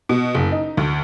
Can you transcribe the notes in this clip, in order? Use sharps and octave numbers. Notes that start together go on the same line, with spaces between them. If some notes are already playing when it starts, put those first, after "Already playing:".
B2
F#1
D#4
D2